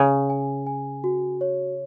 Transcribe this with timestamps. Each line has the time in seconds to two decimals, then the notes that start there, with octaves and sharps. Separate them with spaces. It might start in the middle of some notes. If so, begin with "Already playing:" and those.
Already playing: C#3 C#5
0.30 G#5
0.66 G#5
1.04 F#4
1.41 C#5